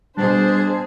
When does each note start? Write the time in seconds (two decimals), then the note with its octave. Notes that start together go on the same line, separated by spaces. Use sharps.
0.17 B2 G3 D4 G#4 C5